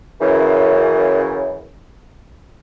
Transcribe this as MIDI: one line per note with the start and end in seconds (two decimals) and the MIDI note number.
0.21 1.69 42
0.21 1.69 49
0.21 1.69 52